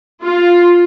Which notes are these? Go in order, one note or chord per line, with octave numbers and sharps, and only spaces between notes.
F4